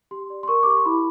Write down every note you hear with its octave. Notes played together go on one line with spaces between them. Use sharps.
G4 C6
D5
C6
A#4 C#6
D6
G4 C#6
C6
E4 B5